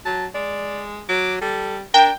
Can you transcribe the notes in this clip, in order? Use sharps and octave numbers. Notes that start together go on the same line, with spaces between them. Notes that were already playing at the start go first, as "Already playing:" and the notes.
F#3 A5
G#3 D5
F#3 D6
G3 A4
D4 A#4 G5